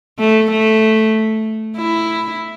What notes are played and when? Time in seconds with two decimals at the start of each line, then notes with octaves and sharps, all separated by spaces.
0.19 A3
0.51 A3
1.76 E4